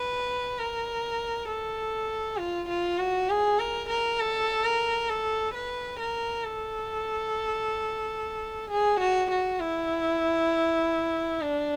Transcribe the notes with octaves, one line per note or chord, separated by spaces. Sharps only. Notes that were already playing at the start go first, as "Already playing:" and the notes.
Already playing: B4
A#4
A4
F4
F4
F#4
G#4
A#4
A#4
A4
A#4
A4
B4
A#4
A4
G#4
F#4
F#4
E4
D4